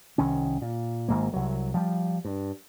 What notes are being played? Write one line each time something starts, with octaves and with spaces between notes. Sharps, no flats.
C2 D#3 C#4
A#2
G#1 G#2 A#3
C2 F#3
F3 G3
G2